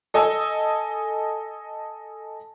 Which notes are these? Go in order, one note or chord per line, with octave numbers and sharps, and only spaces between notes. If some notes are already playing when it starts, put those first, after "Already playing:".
A4 D#5 G#5 E6